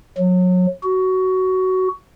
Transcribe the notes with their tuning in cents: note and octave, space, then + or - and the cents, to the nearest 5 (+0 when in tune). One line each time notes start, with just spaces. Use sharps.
F#3 -30
F#4 +15